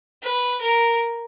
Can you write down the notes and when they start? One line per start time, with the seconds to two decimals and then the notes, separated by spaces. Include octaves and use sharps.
0.22 B4
0.61 A#4